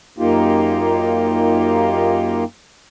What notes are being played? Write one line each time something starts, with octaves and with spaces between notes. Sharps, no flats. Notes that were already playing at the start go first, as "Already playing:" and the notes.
F#2 A#3 D#4 F4 G4